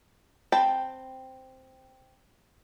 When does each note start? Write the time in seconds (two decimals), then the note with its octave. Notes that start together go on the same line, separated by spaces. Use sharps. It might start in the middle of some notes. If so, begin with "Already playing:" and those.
0.52 C4 G5 A5 B5